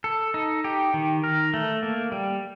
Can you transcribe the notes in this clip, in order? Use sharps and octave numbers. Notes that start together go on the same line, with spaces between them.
A4
D#4
G4
D#3
A#4
A3
A#3
G3